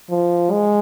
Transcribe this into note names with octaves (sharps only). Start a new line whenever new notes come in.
F3
G#3